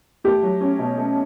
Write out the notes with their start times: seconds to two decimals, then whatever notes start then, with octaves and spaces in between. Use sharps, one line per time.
0.24 A3 G4
0.43 F#3
0.61 C#4
0.79 B2
0.98 A3